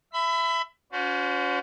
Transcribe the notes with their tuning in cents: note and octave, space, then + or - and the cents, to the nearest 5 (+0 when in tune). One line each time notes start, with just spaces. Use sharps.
E5 +10 B5 +30
C#4 +30 F#4 -40 C5 -35